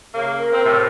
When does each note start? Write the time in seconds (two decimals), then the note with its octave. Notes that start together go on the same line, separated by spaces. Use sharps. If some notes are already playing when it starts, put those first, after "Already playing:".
0.14 C#3 A#3
0.39 A#4
0.52 C4
0.65 A2 C3